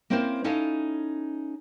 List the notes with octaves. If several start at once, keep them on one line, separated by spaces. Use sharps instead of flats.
A#3 C4 C#4 E4 A#4 C5
C#4 D#4 E4 A4 F5